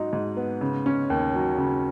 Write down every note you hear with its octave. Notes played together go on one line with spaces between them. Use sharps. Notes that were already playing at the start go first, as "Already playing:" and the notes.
Already playing: G#2 F#3 D#4
G#2
B3
C#3
C#4
D#2
F#3
C#3